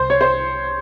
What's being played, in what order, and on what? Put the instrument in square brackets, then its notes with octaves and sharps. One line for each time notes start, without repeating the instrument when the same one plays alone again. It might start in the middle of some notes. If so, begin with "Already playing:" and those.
Already playing: [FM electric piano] C2 [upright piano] C5
[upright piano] C#5
C5